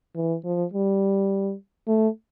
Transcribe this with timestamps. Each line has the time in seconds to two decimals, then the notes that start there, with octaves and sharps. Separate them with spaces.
0.15 E3
0.45 F3
0.73 G3
1.88 A3